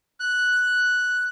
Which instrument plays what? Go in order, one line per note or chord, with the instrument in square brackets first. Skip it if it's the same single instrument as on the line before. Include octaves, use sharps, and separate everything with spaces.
[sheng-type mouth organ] F#6